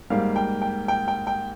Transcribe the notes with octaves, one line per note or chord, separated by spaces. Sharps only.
G#2 G3 A#3 F5
G5
G5
G5
G5
G5